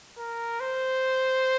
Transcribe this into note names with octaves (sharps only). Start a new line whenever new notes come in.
A#4
C5